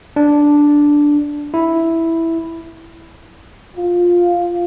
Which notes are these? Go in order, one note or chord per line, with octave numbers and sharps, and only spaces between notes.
D4
E4
F4